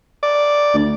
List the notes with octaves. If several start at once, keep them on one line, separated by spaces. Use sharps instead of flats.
D5
D2